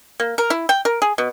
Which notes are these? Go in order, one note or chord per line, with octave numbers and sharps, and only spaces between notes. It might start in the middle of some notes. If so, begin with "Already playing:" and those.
A#3
A#4
E4
G5
A#4
G#4
B2